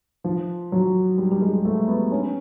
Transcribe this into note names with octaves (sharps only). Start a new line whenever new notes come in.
F3
F#3
G3
G3
G#3
A3
B3
C#4